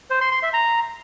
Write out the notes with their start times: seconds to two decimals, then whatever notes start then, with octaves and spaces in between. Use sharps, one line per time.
0.10 C5
0.21 C6
0.32 C6
0.43 E5
0.53 A#5